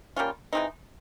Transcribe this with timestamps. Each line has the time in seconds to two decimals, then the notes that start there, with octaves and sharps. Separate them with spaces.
0.16 G3 A#3 C#4 F4
0.53 E3 G#3 C4 D#4